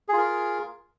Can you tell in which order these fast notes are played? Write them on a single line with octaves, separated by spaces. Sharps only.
G#4 F4 A#4